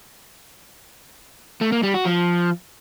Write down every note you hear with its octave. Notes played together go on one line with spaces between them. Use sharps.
A3
A#3
G3
F#4
F3